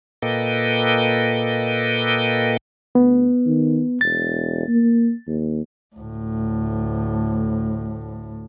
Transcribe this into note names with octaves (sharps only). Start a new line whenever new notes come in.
A#2 A#3 A4 B4 D#5 G5
D2 B3
D#3
E1 A6
A#3
D#2
D2 A2